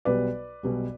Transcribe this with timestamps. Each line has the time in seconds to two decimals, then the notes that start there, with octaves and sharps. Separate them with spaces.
0.05 B1 B2 G3 B3 B4 D5
0.63 B1 B2 G3 B3